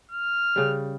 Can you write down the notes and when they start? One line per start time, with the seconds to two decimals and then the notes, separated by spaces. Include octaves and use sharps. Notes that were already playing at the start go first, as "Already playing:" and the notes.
0.11 F6
0.56 C#3 G3